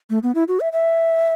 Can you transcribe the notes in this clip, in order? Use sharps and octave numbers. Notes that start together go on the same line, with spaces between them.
A3
B3
E4
F#4
E5
E5